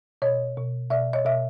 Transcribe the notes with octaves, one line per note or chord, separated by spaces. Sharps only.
B2 C#5 D#5
B2
B2 D5 E5
C#5 D#5
B2 E5